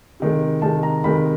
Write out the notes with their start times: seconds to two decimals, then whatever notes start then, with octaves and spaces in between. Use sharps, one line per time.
0.20 C3 D#3 G#3
0.62 C3 D#3 G#3 A5
0.83 A#5
1.04 C3 D#3 G#3 B5